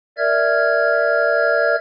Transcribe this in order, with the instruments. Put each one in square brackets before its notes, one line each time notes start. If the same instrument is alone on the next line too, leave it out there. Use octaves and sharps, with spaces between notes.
[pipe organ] A#4 D5 E5 F6 G#6